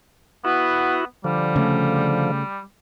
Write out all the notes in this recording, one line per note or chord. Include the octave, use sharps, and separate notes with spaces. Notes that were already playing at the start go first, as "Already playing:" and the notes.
B3 E4 F#4
D3 F3 G3
C#3 A3